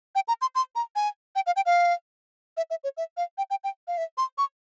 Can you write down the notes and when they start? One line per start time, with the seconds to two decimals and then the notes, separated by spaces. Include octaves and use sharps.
0.15 G5
0.28 A#5
0.41 C6
0.55 C6
0.75 A#5
0.95 G#5
1.35 G5
1.46 F5
1.56 G5
1.66 F5
2.57 E5
2.70 E5
2.84 C#5
2.97 E5
3.17 F5
3.38 G5
3.50 G5
3.64 G5
3.87 F5
3.97 E5
4.17 C6
4.38 C#6